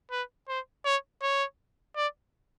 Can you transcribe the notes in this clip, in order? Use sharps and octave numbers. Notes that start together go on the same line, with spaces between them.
B4
C5
C#5
C#5
D5